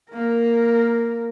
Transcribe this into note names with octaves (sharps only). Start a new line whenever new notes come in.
A#3 A#4